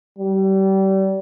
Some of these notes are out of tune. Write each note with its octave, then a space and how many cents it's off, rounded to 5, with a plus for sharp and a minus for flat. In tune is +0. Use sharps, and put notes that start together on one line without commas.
G3 -30